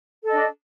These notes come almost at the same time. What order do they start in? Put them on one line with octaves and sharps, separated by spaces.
A4 D#5 D4